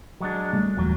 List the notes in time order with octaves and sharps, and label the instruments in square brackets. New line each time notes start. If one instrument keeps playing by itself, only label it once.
[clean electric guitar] F#3 G#3 D4
[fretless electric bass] G3 A3
[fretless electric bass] D#1 E2 G3 [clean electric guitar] A#2 F#3